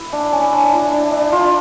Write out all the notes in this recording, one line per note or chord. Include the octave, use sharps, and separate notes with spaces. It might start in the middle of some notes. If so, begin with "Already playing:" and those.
Already playing: E4
D4
C#4
D4
E4
D4
D4
F4